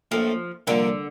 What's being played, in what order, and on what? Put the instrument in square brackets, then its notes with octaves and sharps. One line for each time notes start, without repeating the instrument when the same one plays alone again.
[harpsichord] A#1 A2 A3 [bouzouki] F3
[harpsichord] C2 A#2 F3 A#3 D4 [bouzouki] D3